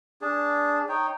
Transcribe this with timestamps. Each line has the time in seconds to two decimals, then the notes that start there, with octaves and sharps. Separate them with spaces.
0.22 D4 G#4 A5
0.89 D#4 C#5 G5